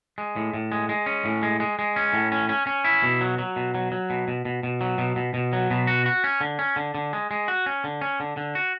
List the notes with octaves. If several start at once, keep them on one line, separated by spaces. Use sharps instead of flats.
G#3
A2
A2
G#3
G#3
C#4
A2
G#3
G#3
G#3
C#4
A2
C#4
C#4
C#4
E4
B2
F#3
F#3
B2
F#3
F#3
B2
B2
B2
B2
F#3
B2
B2
B2
F#3
B2
F#4
F#4
C#4
D3
C#4
D3
D3
G#3
G#3
F#4
C#4
D3
C#4
D3
D3
F#4